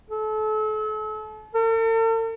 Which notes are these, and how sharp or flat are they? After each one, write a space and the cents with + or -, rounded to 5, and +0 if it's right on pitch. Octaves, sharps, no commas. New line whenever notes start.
A4 -35
A4 +45